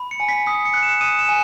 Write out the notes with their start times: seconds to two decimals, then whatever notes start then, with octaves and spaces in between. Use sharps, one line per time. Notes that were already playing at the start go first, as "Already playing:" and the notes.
Already playing: B5
0.11 C#7
0.20 G#5
0.29 B6
0.46 D#6 B6
0.65 C#7
0.74 F#6
0.83 E7
1.01 D#6 D#7
1.19 E7
1.29 G#5